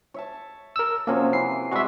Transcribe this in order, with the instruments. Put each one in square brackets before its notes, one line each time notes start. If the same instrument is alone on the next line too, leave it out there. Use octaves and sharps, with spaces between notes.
[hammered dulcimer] C#5 E5 A5
[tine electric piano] A#4 E6
[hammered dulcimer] C3 F3 F#3 [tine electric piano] A#3 C#4
[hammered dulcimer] E3 E4 [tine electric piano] C7
[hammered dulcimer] G3 G#3 C4 [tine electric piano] F#4 E5